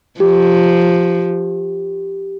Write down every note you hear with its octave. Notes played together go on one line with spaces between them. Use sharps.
F3 G4